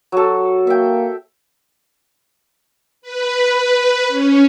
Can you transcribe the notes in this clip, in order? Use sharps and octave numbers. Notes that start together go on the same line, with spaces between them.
F#3 A4
A#3 E5 G5
B4
B4
C#4